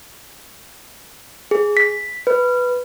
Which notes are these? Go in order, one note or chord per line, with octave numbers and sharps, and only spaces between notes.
G#4
B6
B4